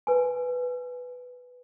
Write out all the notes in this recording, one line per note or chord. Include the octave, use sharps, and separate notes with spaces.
A#4 B4 G#5